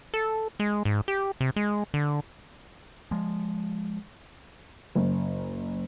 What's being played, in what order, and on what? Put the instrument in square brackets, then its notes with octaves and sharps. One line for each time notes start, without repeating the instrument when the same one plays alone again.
[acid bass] A4
G#3
G#2
G4
C3
G#3
D3
[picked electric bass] F3 G#3
[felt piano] F#1